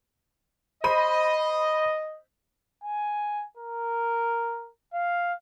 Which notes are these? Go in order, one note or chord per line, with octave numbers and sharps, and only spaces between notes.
C5 D#5 B5 D#7
G#5
A#4
F5